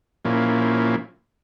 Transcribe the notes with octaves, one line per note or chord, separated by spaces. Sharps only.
A#2 F3 A#3 C#4 E4